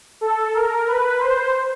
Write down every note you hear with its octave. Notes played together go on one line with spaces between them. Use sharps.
A4
A#4
B4
C5